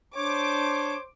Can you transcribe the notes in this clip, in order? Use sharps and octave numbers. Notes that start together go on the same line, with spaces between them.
D4 C5 C#5 D6